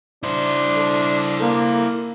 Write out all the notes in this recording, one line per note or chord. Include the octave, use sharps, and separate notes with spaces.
D4 E4 C5
A4
A#3